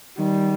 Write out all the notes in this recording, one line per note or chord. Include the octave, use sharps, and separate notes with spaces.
D#3 G3